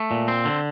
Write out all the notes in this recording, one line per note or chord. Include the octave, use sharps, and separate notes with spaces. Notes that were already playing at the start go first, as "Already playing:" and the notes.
Already playing: A3
A#2
C4
D3